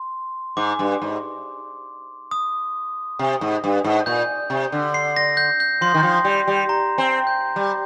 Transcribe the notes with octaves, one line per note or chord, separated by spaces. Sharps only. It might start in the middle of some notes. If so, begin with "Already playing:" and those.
Already playing: C6
G#2 D6
G2
G#2
D#6
C3
G#2
G2
G#2
A#2 G6
C3
D3
C7
A#6
G6
G6
F3 C6
D#3
F3
G3
G3
A#5
C4
G6
G3